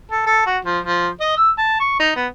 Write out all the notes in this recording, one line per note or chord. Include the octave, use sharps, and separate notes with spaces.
A4
A4
F#4
F3
F3
D#5
E6
A5
C#6
D#4
B3